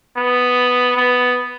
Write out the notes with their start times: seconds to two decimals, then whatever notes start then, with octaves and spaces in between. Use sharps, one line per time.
0.17 B3
0.97 B3